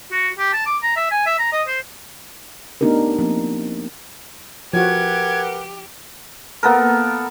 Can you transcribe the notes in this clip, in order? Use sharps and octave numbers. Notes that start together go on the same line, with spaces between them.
F#4
G4
A5
D6
A#5
E5
G#5
E5
A#5
D#5
C5
A3 B3 D4 D#4 G4 A#4
F3 A#3 C4
F3 F#4 G4 A#4 B4 F#5 G#6
A#3 B3 A4 A#4